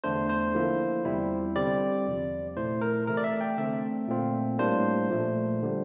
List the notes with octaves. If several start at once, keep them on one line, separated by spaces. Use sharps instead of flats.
E2 D3 A3 D4 C5
C5
D3 F3 A#3 E4
E2 C3 G3 C4 E4
D3 G3 C4 D5
E2 C3 F3
A#2 A3 E4 C5
A#4
C3 E3 A3 A#4
D5
E5
G5
D3 A3 C4 E5
A#2 A3 C4 F4
A2 G3 A#3 D4 C5
A#2 F3 A3
D3 G3